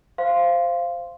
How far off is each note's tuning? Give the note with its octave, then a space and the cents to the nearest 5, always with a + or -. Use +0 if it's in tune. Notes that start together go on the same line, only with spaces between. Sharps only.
C5 +0 F5 -15 C6 +0